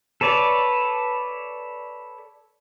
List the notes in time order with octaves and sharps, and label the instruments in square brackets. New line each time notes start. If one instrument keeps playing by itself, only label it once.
[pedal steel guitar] A4 B4 C#5 D5